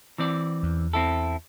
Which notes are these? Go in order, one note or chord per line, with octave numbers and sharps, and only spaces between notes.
E3 C4 D5
E2
C4 E4 A4